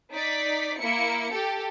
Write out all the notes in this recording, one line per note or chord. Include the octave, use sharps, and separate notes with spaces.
D#4 D5 B6
A#3 E4 C#7
G4 A4